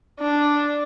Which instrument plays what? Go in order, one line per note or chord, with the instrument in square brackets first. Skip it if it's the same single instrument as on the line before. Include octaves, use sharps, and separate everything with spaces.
[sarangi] D4